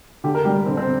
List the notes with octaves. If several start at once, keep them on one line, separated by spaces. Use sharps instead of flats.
D3 G4
A#4
G3 G4
D3 C4
C4